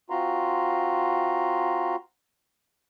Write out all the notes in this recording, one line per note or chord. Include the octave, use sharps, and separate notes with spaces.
C4 F4 F#4 A#5 C6